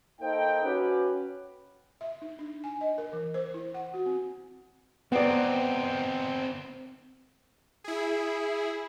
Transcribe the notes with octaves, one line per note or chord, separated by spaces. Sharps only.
A#3 D#4 A4 C5 G5
C#4 F#4 G4 B4
E5
D#4
D4
G#5
D#5
A#4
E3
C5
E4
F#5
F#4
C4
B3 C4 D#4 D5
E4 G#4